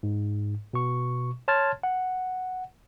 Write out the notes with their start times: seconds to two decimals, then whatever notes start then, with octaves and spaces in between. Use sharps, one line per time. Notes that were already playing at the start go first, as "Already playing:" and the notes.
0.03 G#2
0.73 B2 C#6
1.48 C#5 A5 C6 F6 G#6 A6
1.83 F#5